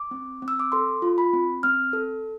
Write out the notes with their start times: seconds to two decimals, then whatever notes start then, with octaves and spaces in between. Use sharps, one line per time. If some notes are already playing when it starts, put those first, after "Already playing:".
Already playing: D6
0.11 C4
0.42 C4
0.48 E6
0.60 D6
0.72 A4 C6
1.02 F4
1.18 B5
1.33 C4
1.63 C4 F6
1.93 A4